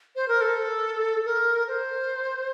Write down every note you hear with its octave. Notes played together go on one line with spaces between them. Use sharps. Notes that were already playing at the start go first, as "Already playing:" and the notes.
C5
A#4
A4
A#4
C5